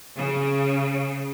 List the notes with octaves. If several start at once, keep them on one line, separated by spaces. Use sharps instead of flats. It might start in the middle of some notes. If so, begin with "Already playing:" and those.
C#3